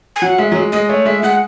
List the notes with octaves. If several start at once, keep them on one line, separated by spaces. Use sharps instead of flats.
G#5
F#3 F#5
G#3 E5
F#3
G#3
G#3 D#5
A3 C#5
G#3 E5
G#3 F#5